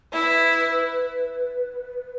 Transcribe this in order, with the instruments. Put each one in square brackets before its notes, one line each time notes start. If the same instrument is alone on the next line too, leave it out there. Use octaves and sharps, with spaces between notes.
[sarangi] E4 [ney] B4